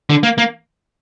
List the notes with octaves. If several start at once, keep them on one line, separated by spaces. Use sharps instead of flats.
D3
A#3
A#3